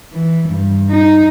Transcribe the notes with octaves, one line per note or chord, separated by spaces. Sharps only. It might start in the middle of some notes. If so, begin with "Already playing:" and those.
E3
G2
D#4